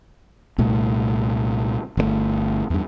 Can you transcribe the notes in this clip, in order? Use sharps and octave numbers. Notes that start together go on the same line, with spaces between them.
C2 A#2 A3
G1 C3 A3
E2 G2